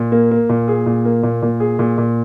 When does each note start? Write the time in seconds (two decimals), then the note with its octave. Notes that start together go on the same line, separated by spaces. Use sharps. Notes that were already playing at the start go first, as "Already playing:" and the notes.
Already playing: A#2
0.12 A#3
0.31 A#3
0.49 A#2
0.68 G#4
0.86 A#2
1.05 A#3
1.23 A#2
1.42 A#2
1.60 G#4
1.79 A#2
1.98 A#2